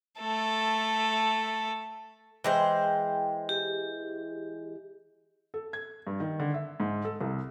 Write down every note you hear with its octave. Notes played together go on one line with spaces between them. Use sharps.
A3 A4
E3 G#3 C5 G5
G4
A4
G#6
G2
D#3
D3
E5
G#2
A4
C2